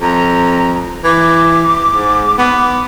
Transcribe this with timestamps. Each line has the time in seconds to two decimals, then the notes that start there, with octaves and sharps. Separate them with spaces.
0.01 F2 A#5
1.04 E3 D6
1.89 G#2
2.38 B3 D6